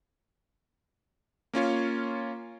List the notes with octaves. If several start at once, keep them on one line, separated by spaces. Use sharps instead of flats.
A#3 C#4 F4 C#5